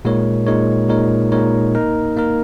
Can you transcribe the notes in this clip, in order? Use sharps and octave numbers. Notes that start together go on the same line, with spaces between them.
A#2 G#3 D#4 A#4 C#5
A#2 G#3 D#4 A#4 C#5
A#2 G#3 D#4 A#4 C#5
A#2 G#3 D#4 A#4 C#5
A#3 D#4 A#4
A#3 D#4 A#4